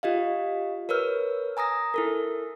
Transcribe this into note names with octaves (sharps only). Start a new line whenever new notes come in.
F4 G4 D#5 F5
A#4 B4 C#5 E6 F6
G#5 A#5 D#6 A#6
E4 A4 A#4